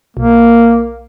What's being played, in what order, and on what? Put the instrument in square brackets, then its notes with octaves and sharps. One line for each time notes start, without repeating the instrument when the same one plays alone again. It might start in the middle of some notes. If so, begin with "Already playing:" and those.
[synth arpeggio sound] B1 [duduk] A#3